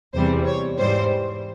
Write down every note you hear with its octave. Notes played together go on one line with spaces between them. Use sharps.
E2 C3 E3 G3 C5
C#5
G#2 E3 G3 C5